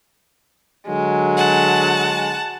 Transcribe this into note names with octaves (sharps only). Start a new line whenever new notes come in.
D3 F#3 G#3
F#5 A5